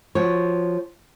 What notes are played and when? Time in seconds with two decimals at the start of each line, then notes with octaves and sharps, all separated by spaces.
0.15 F3 F#4 C#5